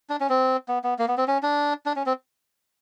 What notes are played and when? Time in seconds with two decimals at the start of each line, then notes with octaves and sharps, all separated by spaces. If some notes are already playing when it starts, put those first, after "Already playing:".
0.10 D4
0.20 C#4
0.29 C4
0.68 B3
0.84 B3
0.99 A#3
1.08 B3
1.18 C4
1.28 C#4
1.43 D4
1.86 D4
1.96 C#4
2.06 C4